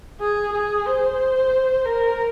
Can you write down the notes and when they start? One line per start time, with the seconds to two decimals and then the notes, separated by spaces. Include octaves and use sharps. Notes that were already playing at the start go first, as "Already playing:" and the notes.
0.20 G#4
0.53 G#4
0.86 C5
1.86 A#4